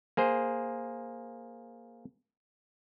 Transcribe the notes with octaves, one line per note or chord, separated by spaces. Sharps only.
A#3 G#4 C5